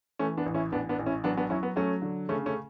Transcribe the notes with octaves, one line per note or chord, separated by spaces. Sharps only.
E3 A3 C#4
B3 D4
A1
C#4 E4
A1 B3 D4
B3 D4
A1
C#4 E4
F#3 B3 D4
B3 D4
F#3 C#4 E4
B3
F#3 A3 C#4
D3
C#3 A3 C#4
A3 C#4